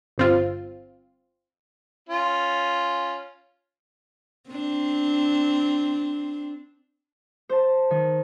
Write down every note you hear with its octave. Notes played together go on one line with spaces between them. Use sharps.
G1 C4 F4
C#4 F4
C4 D4
C5 A5
D#3